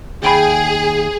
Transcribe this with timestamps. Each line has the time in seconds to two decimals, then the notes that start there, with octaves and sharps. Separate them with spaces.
0.23 D#2 G#4 G5 B5